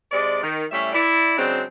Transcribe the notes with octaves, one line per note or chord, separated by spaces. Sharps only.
C3 G#3 D5
D#3
A2 G3 C#4 E5
E4 D5
C#3 F#3 G#3 C4 D4